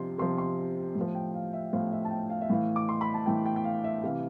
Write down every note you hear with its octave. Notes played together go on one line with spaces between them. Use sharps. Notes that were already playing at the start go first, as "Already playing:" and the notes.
Already playing: C3 F3 C6
C3 F3 C6
C6
A2
F3
G5
F5
E5
A2 F3 F5
E5
A5
G5
F5
E5
A2 E3 F5
D6
C6
B5
A5
A2 E3 G5
G5
G5
F5
E5
C3 E3 F5